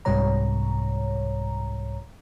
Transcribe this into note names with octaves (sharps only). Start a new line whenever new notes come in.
C2 G#2 C3 G3 C#5 A#5